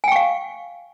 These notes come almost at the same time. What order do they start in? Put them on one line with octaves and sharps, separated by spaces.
G#5 G5 C#6 F5